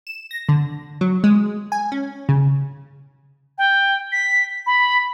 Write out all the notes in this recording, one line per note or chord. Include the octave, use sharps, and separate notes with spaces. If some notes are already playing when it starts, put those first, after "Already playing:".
E7
A#6
D3
F#3
G#3
G#5
C#4
C#3
G5
B6
B5